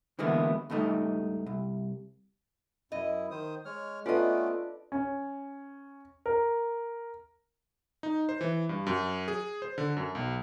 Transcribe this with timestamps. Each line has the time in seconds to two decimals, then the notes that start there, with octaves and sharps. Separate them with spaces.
0.19 D3 E3 G#3 A#3 B3 E4
0.70 C#2 G2 A3 D#4
1.46 C2
2.92 F#2 E4 D#5
3.31 D#3 C5 D#6
3.65 G#3 C#5 F6
4.06 A3 B3 C#4 D4 F4 A4 B4 D#5
4.92 C#4
6.26 A#4
8.03 D#4
8.29 C5
8.41 E3
8.69 G2
8.87 F#2
9.28 G#4
9.62 C5
9.78 D3
9.97 F#2
10.15 B1